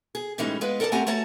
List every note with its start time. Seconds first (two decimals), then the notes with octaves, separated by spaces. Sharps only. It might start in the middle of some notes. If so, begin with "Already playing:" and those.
0.15 G#4
0.38 A2 E3 G3 G#3 C#4 D#4
0.61 G#3 B3 B4 F5
0.80 A4 A#4 D5 F#5 A5
0.92 A3 C4 G4 F#5 G#5 A#5
1.07 A3 F#4 C#5 A5 A#5